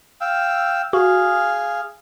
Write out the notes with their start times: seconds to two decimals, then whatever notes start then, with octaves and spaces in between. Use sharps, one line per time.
0.21 F5 G5 E6
0.93 F#4 G#4 F5